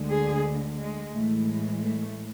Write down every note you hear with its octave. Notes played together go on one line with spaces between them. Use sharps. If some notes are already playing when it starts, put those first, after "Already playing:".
Already playing: D2 D3 G#3
G#4
G#3
A2 E3 G#3 A3
A3